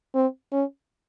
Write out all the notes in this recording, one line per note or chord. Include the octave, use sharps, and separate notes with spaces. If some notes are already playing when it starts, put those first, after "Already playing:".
C4
C#4